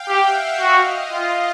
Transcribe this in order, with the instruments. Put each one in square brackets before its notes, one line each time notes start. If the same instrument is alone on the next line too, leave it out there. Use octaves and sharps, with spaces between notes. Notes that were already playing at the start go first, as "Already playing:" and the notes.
Already playing: [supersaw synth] F5 G5
[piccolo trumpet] G4 [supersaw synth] E5 F#5
[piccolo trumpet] F#4 [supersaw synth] D#5 F5
[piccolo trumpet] F4